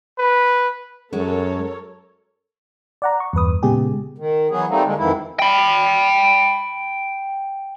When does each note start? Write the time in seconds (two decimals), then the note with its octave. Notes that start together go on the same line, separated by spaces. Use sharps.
0.19 B4
1.13 F#2 G#3 F#4 A4 A#4 C#5
3.02 D5 F#5 A#5
3.20 C#6
3.33 E2 G2 B4 D#6
3.63 A#2 C#3 G#3 B3 G4 G#4
4.18 D#3
4.50 E3 F#3 B3 G#4
4.69 G3 A3 A#3 C4 D#4
4.85 D3 G#3 A#3
4.98 F2 G#2 D#3 E3 E4
5.39 G5 B5